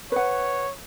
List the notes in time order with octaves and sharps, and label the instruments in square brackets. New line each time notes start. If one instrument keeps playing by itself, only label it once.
[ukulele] B4 F#5 [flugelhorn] C#5